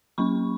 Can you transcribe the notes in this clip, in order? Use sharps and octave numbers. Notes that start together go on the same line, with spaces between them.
F#3 A#3 C#4 B5 C#6